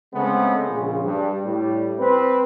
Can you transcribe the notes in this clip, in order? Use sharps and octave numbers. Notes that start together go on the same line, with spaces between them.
C#3 G#3 A3 B3 C4
A#1 C#3
G2
A2 G3
C4 B4